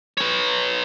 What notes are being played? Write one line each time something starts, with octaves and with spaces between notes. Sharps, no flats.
B4 C#5